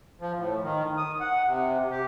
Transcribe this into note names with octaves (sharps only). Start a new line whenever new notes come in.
F3
A2
D#3
D#6
F#5
C3
G4